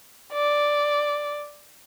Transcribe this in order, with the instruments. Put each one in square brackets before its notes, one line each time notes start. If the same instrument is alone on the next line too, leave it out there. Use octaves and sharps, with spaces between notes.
[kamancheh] D5